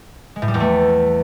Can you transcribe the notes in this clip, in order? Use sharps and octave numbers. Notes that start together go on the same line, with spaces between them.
G#3
A2
G3
E2
A3